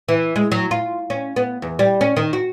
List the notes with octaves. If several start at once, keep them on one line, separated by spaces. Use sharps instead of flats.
E3
G#3
F#3
F4
C#4
B3
E2
G3
C#4
D#3
F#4